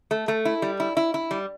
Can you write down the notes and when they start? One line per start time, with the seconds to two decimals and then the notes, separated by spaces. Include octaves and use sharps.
0.11 A3
0.28 A3
0.45 E4
0.62 G3
0.80 E4
0.97 E4
1.14 E4
1.31 G3